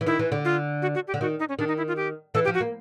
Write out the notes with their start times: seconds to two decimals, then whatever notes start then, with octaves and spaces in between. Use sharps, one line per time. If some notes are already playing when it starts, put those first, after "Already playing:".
0.01 E3
0.06 D#3 E4
0.19 E3
0.32 D3
0.45 F4
0.82 F#4
0.95 F#4
1.07 G4
1.14 D3
1.21 D#3 F#4
1.40 D#4
1.49 C#4
1.59 D#3 D4
1.68 D#4
1.77 E4
1.88 F4
1.96 G4
2.34 E3 A4
2.45 G4
2.47 F3
2.54 F#4
2.60 A#3